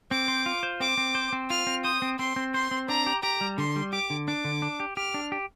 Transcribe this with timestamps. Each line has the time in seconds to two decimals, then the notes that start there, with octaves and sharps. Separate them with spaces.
0.11 C4 D6
0.28 C5
0.46 F4
0.63 C5
0.80 C4 D6
0.98 C4
1.15 C5
1.33 C4
1.50 F4 F6
1.67 C4
1.84 C5 D#6
2.02 C4
2.19 C4 C6
2.36 C4
2.54 C5 C6
2.71 C4
2.89 D4 A#5
3.06 G4
3.23 G4 A#5
3.41 G3
3.58 D3 C6
3.76 G3
3.93 G4 D6
4.10 D3
4.28 D4 D6
4.45 D3
4.62 D4
4.80 G4
4.97 G4 F6
5.14 D4
5.32 G4